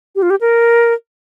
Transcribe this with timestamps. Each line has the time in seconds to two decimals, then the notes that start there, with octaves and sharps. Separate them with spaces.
0.16 G4
0.22 F4
0.30 G4
0.41 A#4